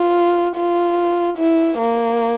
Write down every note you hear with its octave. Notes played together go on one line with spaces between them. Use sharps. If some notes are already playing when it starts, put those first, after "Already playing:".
Already playing: F4
F4
E4
A#3